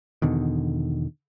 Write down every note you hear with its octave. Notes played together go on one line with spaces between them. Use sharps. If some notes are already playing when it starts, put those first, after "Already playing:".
E2 B2 D3 D#3